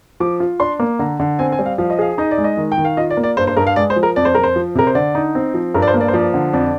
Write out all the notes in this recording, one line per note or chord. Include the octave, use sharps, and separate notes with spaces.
F3 D6
F4
D4 C6
A#3
D3 A#5
D3
C4 G#5
G#5
G3
F5
F3 F5
D#5
G#4 F5
D#4 D#5
D5
G#3
D#5
D#3
G5
D#3
F5
F4 D#5
D5
A#3
D5
G2 C5
C5
G2 A#4
F5
G#3 D5
C5
F3
A#4
F2 D5
C5
F2 A#4
C5
F3
C3 A#4
C5
D3 D5
D#4
C4
F3
G2 A#4
D5
C5
A#3
D5
C5
F3 D5
D3
F2 D5